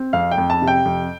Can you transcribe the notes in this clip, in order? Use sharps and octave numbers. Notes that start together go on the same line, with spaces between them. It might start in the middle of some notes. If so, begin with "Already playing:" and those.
Already playing: C4
F2 F5
G5
F2
A5
C3
G5
F2